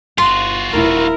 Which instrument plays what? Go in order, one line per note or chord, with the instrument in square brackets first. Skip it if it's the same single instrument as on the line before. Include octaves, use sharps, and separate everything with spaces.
[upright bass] G1 [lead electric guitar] F4 F#4 [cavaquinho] C6
[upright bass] D#1 A3 [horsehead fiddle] E4 A#4